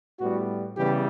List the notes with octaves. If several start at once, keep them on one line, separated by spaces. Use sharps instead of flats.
A2 G3 B3 F#4
C#3 E3 G3 B3 G4